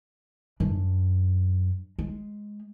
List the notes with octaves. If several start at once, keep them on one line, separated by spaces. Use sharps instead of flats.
F#2 D4
G#3